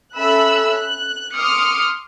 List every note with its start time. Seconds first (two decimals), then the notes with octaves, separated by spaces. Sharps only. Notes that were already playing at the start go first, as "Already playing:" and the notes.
0.17 C#4 A4 E5 B5 E6 F#6
0.73 F#6
1.35 C6 D6 D#6 F6 C#7